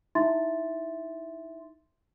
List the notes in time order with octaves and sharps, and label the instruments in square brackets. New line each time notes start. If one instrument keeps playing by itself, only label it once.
[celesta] D#4 E4 E5 C6 A6